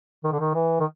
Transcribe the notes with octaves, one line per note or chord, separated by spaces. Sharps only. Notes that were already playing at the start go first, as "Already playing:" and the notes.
D#3
D3
D#3
E3
D#3